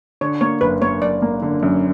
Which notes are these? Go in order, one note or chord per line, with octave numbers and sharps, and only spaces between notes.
D3 C#5
A#3 C#5
F#1 B4
A#3 C#5
F#1 D5
A#3
D3
F#2